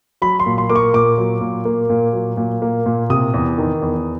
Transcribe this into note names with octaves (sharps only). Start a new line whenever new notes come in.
F#3 B5
C6
A#2
C6
A#3 D6
C#6
A#2 D6
F#3
A#2
A#3
A#2
F#3
A#2
A#3
A#2
C3 D#6
E2
D#3
E2